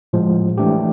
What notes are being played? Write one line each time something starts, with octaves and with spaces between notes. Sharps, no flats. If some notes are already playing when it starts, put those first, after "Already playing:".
A2 F3 G#3
E3 A3 D4 G4